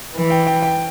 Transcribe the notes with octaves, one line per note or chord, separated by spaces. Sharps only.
E3
G5
G5
G5